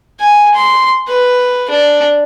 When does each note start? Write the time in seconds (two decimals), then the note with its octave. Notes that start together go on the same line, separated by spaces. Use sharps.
0.20 G#5
0.54 C6
1.08 B4
1.70 D4